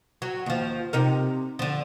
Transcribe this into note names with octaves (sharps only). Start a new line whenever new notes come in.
F#3
D#2 F3
C3 D#4 A#4
D3 F3